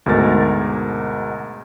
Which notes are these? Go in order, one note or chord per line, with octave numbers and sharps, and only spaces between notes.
D2 G#2 B2 A#4 A6